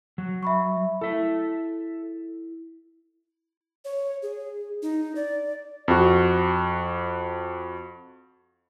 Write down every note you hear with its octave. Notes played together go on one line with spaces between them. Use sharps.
F#3
E5 B5 C#6
E4 A4 E5
C#5
G#4
D#4
D5
F2 F#4